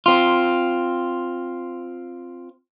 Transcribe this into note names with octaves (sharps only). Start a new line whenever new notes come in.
C4 F4